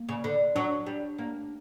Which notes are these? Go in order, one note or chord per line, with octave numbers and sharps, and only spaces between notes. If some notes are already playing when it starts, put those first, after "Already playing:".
Already playing: A#3
C#3
D3
F#3 D4
G3
A#3